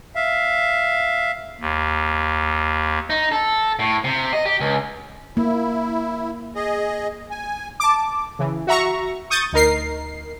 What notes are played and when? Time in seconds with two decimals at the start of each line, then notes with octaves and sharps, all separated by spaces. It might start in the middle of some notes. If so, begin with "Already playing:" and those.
0.15 E5 F5
1.61 D#2
3.10 D#4
3.32 A4
3.79 A2
4.04 C3
4.33 D#5
4.46 G4
4.60 C#2
5.37 A#3 E4
6.56 G#4 D#5
7.31 G#5
7.80 A5 D6
8.39 C#3 E3
8.67 F#4 E5 A#5 C#6
9.30 C#6 D#6 G6 A6
9.52 D2 D#4 A#4 C7